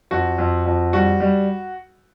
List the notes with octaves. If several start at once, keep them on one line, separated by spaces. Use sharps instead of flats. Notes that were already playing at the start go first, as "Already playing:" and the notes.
F2 F#4
F2
F2
G3 F#4
G3